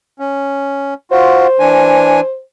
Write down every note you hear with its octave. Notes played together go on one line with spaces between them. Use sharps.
C#4
F4 F#4 C5
E3 D4 G#5